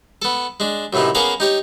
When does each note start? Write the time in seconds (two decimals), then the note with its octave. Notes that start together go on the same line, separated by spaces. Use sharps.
0.22 B3 A4
0.60 G#3 D4
0.93 F#2 A2 C3 E3 D#4
1.15 A#3 B3 C#4 G#4 A#4 F5
1.40 D#4 G4 C#5